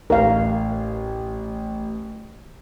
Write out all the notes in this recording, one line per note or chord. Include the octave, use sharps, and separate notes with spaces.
A1 A#4 F5